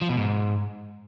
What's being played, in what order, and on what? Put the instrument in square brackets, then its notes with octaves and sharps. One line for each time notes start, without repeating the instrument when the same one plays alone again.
[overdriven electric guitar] F3
B2
G#2